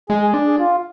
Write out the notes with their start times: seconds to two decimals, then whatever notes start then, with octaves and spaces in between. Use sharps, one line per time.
0.09 G#3 G#4
0.22 G#4
0.34 D4
0.47 G#4
0.59 F4